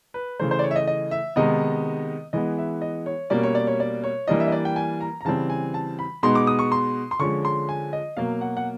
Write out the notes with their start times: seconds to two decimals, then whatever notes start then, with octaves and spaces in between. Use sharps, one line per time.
0.14 B4
0.40 C#3 E3 A3 C5
0.51 C5
0.59 D5
0.64 C#5
0.71 E5
0.76 D#5
0.87 D#5
1.11 E5
1.36 C3 D#3 G#3 B3 D#4 D#5
2.33 E3 G#3 B3 D#5
2.58 E5
2.82 D#5
3.06 C#5
3.30 B2 G3 A#3 C#4 D5
3.43 C#5
3.55 D5
3.67 C#5
3.80 D5
4.04 C#5
4.28 E3 G3 A#3 D4 D#5
4.40 E5
4.48 D#5
4.52 D5
4.65 G5
4.76 G#5
5.01 A#5
5.21 A#5
5.25 C#3 E3 G3 C4 A5
5.50 G#5
5.74 A5
5.99 B5
6.23 B2 G#3 B3 D#4 C6
6.35 D6
6.47 D#6
6.59 C#6
6.72 C6
7.11 C6
7.19 D3 F3 G#3 C#4 C#6
7.45 C6
7.69 G#5
7.93 D#5
8.17 B2 F#3 A#3 F5
8.41 F#5
8.57 F#5